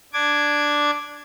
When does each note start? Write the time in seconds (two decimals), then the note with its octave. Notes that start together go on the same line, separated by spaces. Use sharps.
0.13 D4 D6 G#6